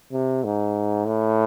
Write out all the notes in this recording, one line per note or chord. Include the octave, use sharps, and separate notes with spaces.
C3
G#2
A2